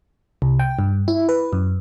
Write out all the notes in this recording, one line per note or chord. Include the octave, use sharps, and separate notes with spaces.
C2
G5
G2
E4
B4
F#2